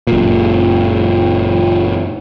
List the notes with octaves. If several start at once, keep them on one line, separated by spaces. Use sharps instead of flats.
F#1 A#2